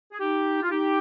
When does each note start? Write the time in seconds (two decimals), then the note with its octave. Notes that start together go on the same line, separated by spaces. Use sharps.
0.12 G#4
0.19 D#4 G4
0.62 F4
0.70 D#4 G4